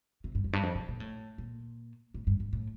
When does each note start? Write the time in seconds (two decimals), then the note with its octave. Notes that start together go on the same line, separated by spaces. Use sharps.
0.24 C3
0.35 G2
0.44 F2
0.53 G2
0.63 F2
0.75 C3
0.88 A#2
1.00 A2
1.38 A#2
2.14 A2
2.27 G2
2.40 G2
2.53 A2